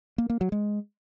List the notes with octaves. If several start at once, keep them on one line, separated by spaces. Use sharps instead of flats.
A#3
A#3
F#3
G#3